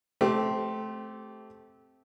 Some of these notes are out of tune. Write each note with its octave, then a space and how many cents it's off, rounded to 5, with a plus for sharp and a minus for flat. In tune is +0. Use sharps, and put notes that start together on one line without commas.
A3 -20 C4 +0 G4 -20